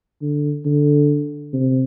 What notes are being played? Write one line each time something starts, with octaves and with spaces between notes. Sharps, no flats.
D3
D3
C3